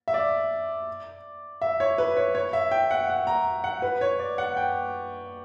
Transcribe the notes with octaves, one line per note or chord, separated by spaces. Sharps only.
E5
D5
E5
C#5
B4
C#5
C#5
E5
G5
F#5
F#5
A#5
F#5
B4
C#5
D5
F#5
G5